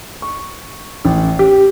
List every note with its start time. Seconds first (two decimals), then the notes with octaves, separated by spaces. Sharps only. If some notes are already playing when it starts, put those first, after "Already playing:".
0.22 C#6
1.05 A1
1.39 G4